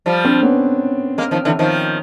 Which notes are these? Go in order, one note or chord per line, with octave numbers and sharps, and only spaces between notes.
F3 G3
C4 D4
B3 C#4
G#3 A#3
D#3 F3
D3 E3
D#3 F3